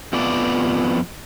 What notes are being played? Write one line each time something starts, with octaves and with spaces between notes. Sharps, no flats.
F2 F3 A3 B3 D5